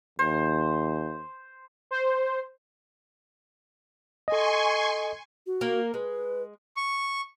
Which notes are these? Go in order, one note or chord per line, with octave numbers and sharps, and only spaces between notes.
D#2 C5
C5
A4 D#5 G#5 C6 C#6
F#4
A#3 A#4
G#3 B4
C#6